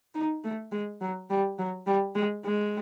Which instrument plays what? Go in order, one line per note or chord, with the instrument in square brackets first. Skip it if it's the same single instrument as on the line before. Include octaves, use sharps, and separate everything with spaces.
[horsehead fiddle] D#4
A3
G#3
F#3
G3
F#3
G3
G#3
G#3